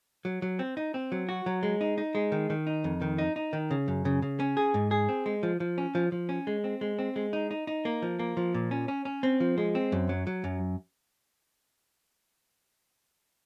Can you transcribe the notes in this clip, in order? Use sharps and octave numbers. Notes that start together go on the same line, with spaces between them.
F#3
F#3
C4
D#4
C4
F#3
F#4
F#3
G#3
D#4
D#4
G#3
D#3
D#3
D#4
F2
D#3
D#4
D#4
D#3
C#3
F#2
C#3
C#3
C#4
G#4
G#2
G#4
C4
G#3
F3
F3
C#4
F3
F3
C#4
G#3
C4
G#3
C4
G#3
D#4
D#4
D#4
A#3
F3
A#3
F3
A#2
C#4
C#4
C#4
C4
F3
G#3
C4
F#2
F#3
F#3
F#2